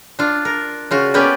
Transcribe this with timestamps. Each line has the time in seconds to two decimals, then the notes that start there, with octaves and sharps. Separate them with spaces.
0.19 D4 F4
0.45 A#4
0.91 C#3 F4 F#4
1.14 A#3 B3 C#4 G4 B4 D5